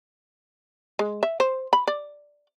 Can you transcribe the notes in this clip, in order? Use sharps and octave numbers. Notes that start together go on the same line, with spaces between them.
G#3
E5
C5
B5
D5